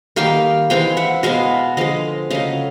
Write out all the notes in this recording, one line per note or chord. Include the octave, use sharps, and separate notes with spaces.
D#3 G3 A#3 F5 G5
E3 G#3 C4 F5 G5
E5 F#5
B2 G#3 B3 D#5 F5
D3 F3 G#3 D#5 F5
C#3 F#3 A3 D#5 F5